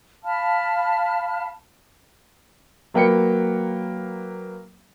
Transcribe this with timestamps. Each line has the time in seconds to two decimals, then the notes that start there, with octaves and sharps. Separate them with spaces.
0.24 F5 A5 B5 F6
2.94 F#3 A#3 B4 G5 C#7